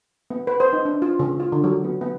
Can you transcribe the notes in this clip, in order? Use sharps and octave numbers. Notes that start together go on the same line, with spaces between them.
B3
B4
C5
D#4
D4
F4
C#3
F4
D3
F#3
B3
B3